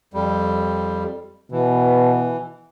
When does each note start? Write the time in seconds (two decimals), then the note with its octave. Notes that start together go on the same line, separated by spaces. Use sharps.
0.14 F2 G3
1.52 B2 E3